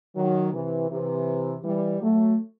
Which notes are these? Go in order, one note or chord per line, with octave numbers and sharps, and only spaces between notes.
D#3 F#3
C3 E3
C3 E3
E3 G3
F#3 A3